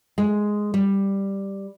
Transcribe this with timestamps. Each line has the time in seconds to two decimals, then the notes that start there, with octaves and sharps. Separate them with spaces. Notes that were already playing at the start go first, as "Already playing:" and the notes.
0.18 G#3
0.74 G3